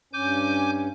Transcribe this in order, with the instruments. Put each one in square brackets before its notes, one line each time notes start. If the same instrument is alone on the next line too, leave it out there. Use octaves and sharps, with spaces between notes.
[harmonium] G2 C#4 [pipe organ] G#5 D6 G6